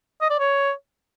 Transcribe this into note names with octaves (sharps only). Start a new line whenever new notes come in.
D#5
D5
C#5